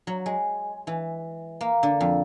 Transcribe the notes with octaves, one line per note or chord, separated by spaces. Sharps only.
F#3
G#3
E3
A#3
D3
F2